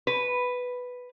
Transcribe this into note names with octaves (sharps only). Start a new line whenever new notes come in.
B4